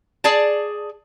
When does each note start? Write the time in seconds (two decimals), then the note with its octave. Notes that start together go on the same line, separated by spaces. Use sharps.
0.24 G#4 D5 A5